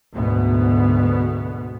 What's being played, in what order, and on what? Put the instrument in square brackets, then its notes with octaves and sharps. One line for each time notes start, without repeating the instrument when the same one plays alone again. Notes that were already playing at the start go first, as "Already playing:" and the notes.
[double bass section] D2 G#2 B2 B3